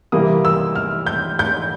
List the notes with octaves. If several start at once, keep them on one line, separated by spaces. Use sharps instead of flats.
C3 E3 G3 A#3 D#6
E6
F6
G6
G6